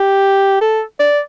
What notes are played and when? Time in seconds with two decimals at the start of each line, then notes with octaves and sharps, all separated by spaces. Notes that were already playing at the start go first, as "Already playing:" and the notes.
Already playing: G4
0.61 A4
1.00 D5